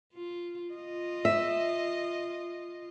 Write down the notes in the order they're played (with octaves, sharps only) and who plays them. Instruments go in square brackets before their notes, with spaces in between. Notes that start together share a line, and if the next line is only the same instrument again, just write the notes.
[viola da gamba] F4
F4 D#5
[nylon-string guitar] E5